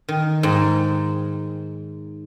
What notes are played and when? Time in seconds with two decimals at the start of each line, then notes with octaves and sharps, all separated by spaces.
0.08 D#3
0.43 G#2